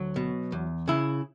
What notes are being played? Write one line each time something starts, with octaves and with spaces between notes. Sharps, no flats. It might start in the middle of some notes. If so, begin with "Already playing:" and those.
Already playing: D2 F#3
B2
E2
C#3 E4